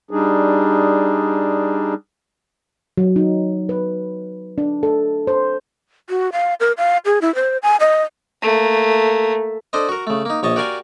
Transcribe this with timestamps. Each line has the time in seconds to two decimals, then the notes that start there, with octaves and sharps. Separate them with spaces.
0.11 G3 D4 D#4 G#4
2.98 F#3
3.16 D#4
3.69 B4
4.58 D4
4.83 A4
5.27 C5
6.10 F#4
6.32 F5
6.60 A#4
6.78 F5
7.05 G#4
7.21 E4
7.35 C5
7.63 G#5
7.80 D#5
8.42 A3 A#3
9.73 D4 A4 C5 D#5
9.89 F#4 A#4
10.07 C#3 A3
10.25 A#3 D#4
10.43 A#1 C#5 D#5 A5
10.56 F#4 G4 A#4 D5 F5 G#5